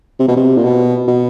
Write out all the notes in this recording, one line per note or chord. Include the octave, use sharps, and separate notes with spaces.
C3
B2
C3
A#2
B2
B2